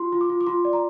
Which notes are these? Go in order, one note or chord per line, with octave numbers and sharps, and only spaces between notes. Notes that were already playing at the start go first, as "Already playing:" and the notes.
Already playing: F4 C6
F4
D6
F4
D6
F4 C6
D5
A#5